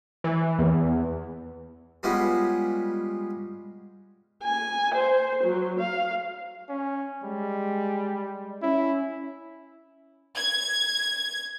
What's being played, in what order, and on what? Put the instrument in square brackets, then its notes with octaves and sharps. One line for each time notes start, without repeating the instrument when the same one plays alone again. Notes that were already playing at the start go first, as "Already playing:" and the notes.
[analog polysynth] E3
E2
[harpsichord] G3 G#3 B3 C#4 F4
[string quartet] G#5
C5
F#3
F5
[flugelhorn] C#4
[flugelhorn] G3 [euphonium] G#3
[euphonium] C#4 [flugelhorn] E4
[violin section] G#6